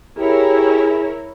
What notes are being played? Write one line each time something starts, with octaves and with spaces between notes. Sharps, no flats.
E4 G4 G#4 A#4 C#5